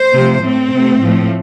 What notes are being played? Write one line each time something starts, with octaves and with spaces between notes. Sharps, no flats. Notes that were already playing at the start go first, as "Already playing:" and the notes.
Already playing: C5
C3 F3 A3
A2 A3 C4
C3 A3
A2 F3 A3